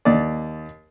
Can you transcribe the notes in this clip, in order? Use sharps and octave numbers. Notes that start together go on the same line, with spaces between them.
D#2 D5